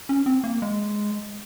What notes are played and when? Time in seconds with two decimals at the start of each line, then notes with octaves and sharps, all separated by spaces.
0.09 C#4
0.26 C4
0.44 A#3
0.62 G#3